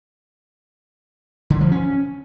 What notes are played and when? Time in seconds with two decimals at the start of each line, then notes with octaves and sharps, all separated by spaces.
1.50 D3
1.61 F3
1.71 C#4